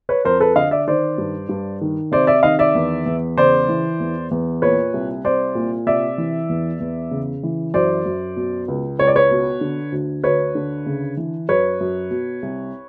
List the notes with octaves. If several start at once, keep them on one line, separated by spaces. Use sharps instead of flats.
B4 C#5
F2 A#4 C5
A4 B4
D3 D#5 F5
D5 E5
D#3 C5 D5
G2
G2
D#3
C3 C5 D5
D5 E5
D#3 D#5 F5
D5 E5
E2
E2
C#3 C5 D5
E3
E2
E2
A#2 B4 C#5
C2
C2 C5 D5
A#2
C3 D5 E5
E3
E2
E2
C#3
E3
F#2 C5 D5
F#2
B2
C#2
C#2 C#5
D5
B4 C#5
B2
D3
D2
D2 B4 C#5
D3
C#3
E3
F#2 B4 C#5
F#2
B2
C2